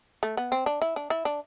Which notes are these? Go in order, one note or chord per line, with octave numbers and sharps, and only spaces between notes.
A3
B3
C4
D4
E4
D4
E4
D4